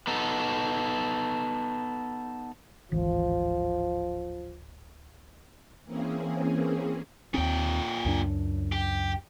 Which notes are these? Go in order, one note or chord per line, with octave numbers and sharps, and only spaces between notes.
B3 D#4 A4
D1 G#1 E3 F3
E3 A#3 C4 C#4 G#4
D#2 A#2 C4 G5
C#2 F#2 D4
G4